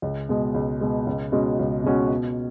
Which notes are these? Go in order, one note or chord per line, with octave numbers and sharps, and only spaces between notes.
C#2
B2 G#3
C#2
B2 G#3
C#2
B2 G#3 C#4 F#4
C#2
B2 G#3 C#4 F#4
B2